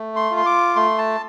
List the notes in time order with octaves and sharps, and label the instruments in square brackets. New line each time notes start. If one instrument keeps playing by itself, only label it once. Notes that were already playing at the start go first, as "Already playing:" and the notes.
Already playing: [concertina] A3
C6
F4
C6
D6
A3 C6
A5